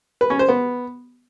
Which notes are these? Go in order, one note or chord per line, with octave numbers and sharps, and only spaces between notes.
B4
C#4
C5
B3